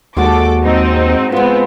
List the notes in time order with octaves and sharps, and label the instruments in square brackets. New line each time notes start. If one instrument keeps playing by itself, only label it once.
[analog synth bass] D#2 [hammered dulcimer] G#3 F#4 F#5 [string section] A4 D6
[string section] G#2 C4 D#4
[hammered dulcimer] F3 G#3 [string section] B3 C4